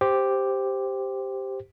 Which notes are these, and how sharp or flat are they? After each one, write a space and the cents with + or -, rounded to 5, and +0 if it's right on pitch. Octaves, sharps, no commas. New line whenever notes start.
G4 +0 C5 +0